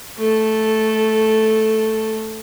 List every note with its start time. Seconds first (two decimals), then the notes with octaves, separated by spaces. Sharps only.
0.18 A3 A4